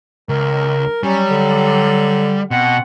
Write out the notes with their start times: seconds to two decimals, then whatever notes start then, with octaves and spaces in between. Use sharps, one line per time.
0.29 C#2 A#4
1.03 F#3 G3 C#4
1.30 D3
2.51 B2 C4 F#5